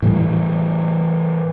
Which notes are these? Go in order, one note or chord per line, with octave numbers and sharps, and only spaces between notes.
A2 E3 G3